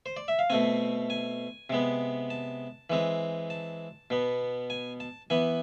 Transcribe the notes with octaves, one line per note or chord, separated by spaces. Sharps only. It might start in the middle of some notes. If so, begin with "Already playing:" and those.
C5
D5
E5
F5
B2 A3 C4 G#5
G#5
C3 G#3 B3
A5
E3 G#3 C4
A5
B2 B3
G#5
A5
E3 B3 G#5